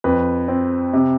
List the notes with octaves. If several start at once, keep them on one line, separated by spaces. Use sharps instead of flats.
F2 B4
C4
C3